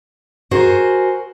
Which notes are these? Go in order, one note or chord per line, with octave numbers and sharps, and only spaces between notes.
F#4 G#4 A#4 C5